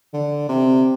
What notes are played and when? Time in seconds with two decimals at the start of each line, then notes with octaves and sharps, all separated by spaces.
0.13 D3
0.49 C3